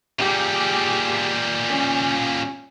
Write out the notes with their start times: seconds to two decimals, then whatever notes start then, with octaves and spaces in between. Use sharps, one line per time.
0.19 A#2 G3 G4 G#4
1.69 C#4